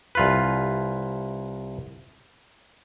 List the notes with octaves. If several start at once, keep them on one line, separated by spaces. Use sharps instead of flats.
C2 F4 B4